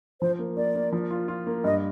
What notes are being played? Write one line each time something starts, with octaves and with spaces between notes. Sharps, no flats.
F3 C5
A#3
A#3 D5
A#3
F3
F4
F4
A#3
G2 D#5